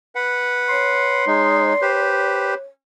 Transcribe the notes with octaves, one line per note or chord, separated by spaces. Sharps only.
B4 F#5
C#5 C6
G#3 D#4
G4 B4 C5